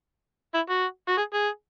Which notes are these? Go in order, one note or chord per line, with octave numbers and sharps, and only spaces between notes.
E4
F#4
F#4
G#4
G#4